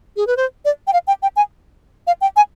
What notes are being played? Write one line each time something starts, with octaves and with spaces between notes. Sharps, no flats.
G#4
B4
C5
D5
G5
F5
G5
G5
G#5
F5
G5
G#5